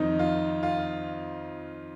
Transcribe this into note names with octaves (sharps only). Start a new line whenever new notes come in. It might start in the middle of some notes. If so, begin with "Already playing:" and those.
Already playing: F2 D#3 D#4
F4
F4